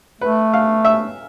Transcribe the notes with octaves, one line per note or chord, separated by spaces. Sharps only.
A3 B4
F5
E5